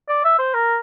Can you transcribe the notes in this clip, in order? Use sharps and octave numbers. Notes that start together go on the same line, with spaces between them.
D5
E5
C5
A#4